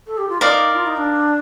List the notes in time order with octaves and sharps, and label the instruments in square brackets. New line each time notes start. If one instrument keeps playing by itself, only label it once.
[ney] A4
G4
F4
[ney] D#4 [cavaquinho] A#4 D5 F5
[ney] F4
D#4
D4